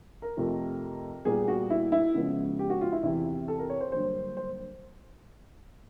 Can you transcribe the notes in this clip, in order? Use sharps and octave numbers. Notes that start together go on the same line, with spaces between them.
A#4
F2 C3 F3 A3
A#2 G3 B3 G#4
F#4
E4
E4
C#3 F3 G#3 B3
G4
F#4
F4
E4
E2 C3 E3 E4
A4
A#4
C#5
C5
G2 D3 F#3 A#3 C5
C5